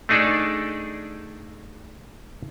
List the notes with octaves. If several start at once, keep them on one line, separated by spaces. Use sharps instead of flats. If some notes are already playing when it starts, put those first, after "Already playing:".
A3 D4 D#4 G#4 A4 D5